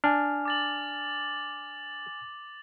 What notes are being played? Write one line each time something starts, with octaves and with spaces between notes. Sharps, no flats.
D4 G#5 F6
D6 A6 F#7